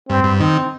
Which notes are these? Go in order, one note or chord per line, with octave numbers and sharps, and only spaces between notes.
G2 C4
G2
D#3 C4